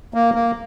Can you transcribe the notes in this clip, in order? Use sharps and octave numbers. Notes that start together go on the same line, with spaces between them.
A#3
A#3